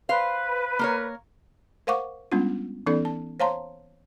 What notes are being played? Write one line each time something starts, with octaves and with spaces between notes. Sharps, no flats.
B4 C5 F5
A#3 A#4 C#5
A#4 C5 F5 F#5 C#6 D6
G3 G#3 B3 C#4 D4 F4
E3 B3 C#4 D#4 A4 D5
A5
C5 C#5 F5 A5 A#5 C6